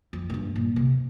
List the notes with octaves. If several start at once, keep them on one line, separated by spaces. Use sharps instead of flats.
F2
A#2
G2
A#2
C3